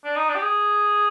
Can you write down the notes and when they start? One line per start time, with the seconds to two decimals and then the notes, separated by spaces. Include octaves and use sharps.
0.04 D4
0.16 D#4
0.29 D4
0.35 G4
0.42 G#4